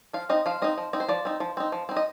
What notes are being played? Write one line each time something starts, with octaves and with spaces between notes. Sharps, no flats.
F3 F5
C4 D#4 D#5
F3 F5
C4 D#4 D#5
F3
C4 D#4
C5
F3 D5
C4 D#4
F3
C4 D#4
F3
C4 D#4
D#5